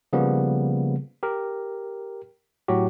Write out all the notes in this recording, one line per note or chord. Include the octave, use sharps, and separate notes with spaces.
C#3 F3 G3 A#3 B3
G4 A#4
A2 F#3 F#4 G4